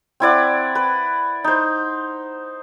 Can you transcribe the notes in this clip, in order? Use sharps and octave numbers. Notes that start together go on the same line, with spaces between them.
C4 E4 D5 F#5
B4
D#4 C5